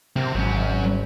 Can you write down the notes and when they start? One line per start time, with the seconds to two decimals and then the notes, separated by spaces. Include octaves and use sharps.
0.16 C3 C4 A#4
0.35 G#1 F#3 C#4